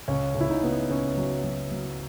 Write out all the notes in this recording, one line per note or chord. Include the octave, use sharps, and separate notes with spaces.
C#2 C#4
C#2
E4
D#4
B3
C#2 C#4
F#3
F#3
F#3